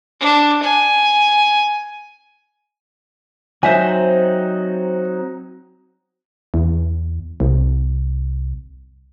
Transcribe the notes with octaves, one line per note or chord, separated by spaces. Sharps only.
D4
G#5
F#3 C4 D#4 C5 E5 G#5
E2
C2